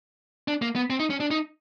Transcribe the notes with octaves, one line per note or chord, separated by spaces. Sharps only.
D4
A#3
B3
C4
D#4
C#4
D4
D#4